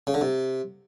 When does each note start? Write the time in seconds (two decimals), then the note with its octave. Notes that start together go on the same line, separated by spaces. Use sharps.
0.07 C#3
0.14 D3
0.21 C3